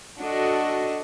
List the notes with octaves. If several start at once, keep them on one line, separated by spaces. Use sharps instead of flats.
D4 F#4 A4 D#5